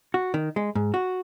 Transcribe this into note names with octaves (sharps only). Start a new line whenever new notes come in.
F#4
D#3
G#3
G#2
F#4